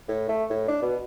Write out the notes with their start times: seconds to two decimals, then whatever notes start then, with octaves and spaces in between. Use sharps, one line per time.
0.08 A2
0.29 A3
0.50 A2
0.68 D4
0.82 B2